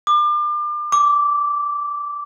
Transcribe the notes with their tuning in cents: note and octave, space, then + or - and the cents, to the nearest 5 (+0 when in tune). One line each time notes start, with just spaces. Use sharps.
D6 +35
D6 -10